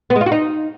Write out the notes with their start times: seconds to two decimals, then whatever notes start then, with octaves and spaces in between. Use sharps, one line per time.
0.10 B3
0.16 G#3
0.21 F4
0.26 F#4
0.32 D#4